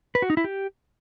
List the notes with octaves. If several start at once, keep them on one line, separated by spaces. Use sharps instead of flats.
B4
F#4
D#4
E4
G4